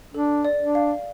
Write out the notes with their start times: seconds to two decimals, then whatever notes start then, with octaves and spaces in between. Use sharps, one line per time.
0.14 D4 A4
0.45 D5
0.60 D4
0.75 F5